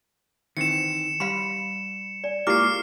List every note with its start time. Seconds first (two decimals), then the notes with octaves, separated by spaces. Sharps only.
0.57 D#3 E3 C4 C#7 E7
1.20 G3 F5 B5 C6
2.24 D5
2.47 G#3 A#3 E4 F4 G4 D6 F6 C7